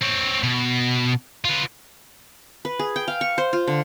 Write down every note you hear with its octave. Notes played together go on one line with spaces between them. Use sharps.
C4 C#5
B2
F4 B4
B4
G#4
G5
F5
C#6
C5
F4
D3